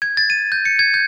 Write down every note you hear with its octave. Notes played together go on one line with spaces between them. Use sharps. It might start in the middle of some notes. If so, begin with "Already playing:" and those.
G#6
A6
D#7
G6
C#7
G#6
G6